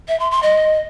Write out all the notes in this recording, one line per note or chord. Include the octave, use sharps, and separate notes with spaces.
E5
C6
C6
D#5